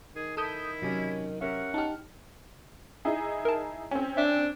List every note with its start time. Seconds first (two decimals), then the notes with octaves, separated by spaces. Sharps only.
0.15 D#3 G#4
0.37 E4 A4 D#6 G6 E7
0.82 C3 F#3 C#4 G4 D#5
1.41 C#4 G4 A#4 E5 F#5
1.74 D#4 G4 A5 F6
3.05 D#4 E4 G#4
3.45 A#4 A5
3.91 C4 C#4
4.17 D4 E5